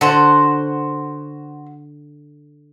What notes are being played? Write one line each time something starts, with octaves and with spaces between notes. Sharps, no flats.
D3 F#4 C5 F#5